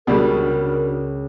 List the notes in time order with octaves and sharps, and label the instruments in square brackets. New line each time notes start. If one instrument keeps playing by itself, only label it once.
[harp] C#2 [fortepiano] B2 G3 G#3 [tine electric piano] D4 F#4 [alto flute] A#4